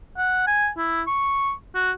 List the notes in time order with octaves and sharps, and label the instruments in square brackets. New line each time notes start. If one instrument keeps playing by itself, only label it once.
[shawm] F#5
G#5
E4
C#6
F#4